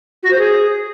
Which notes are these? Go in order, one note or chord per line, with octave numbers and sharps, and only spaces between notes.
F#4
C5
G#4